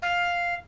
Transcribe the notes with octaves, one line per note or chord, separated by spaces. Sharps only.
F5